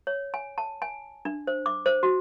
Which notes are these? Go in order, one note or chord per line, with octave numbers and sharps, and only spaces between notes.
C#5
G#5
A5
G#5
D4
C5
D6
C5
F#4